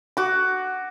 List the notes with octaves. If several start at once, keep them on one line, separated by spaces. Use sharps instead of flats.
F#4 D6